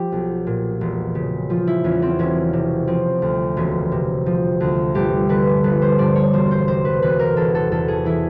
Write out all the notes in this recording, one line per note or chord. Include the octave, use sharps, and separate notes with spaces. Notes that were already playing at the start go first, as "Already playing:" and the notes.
Already playing: F3 G4
B1
A#2
E1
C#3
F3 F4
E4
E2 C#4
C4
E1 C#4
C3
F3 C4
D2
E1 C#4
C3
F3
D2
G1 G4
D3 B4
G1 B4
C5
G2 D5
C#5
E1 C5
C5
C3 C5
B4
E1 B4
A#4
E2 A4
A4
E2 A4
G#4
E3 E4